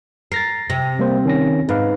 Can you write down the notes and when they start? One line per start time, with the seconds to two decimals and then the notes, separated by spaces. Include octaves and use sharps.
0.32 A#4 A6 A#6 C7
0.70 C3 A#6
0.99 G3 A#3 C5
1.25 D#3 C#4 A#6
1.69 G#2 D#4 B4 F5